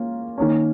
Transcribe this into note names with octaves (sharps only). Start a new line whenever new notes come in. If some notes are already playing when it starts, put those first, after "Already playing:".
Already playing: A#3 C#4 F4
D#3 A#3 C#4